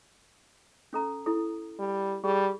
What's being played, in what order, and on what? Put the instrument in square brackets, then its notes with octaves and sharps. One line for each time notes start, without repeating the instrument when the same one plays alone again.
[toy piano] C#4 A4 A#5
E4 A4
[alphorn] G3
[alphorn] G3 [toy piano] G#4